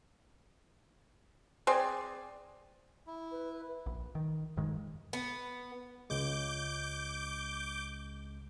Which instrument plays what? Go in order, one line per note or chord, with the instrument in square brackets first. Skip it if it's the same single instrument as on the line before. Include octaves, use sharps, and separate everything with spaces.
[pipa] C4 G#4 D5
[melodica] E4
[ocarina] B4
[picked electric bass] A#1
D#3
D#1 G2 D#3 G#3
[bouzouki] B3
[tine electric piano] C#2 G#3 [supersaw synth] D6 G6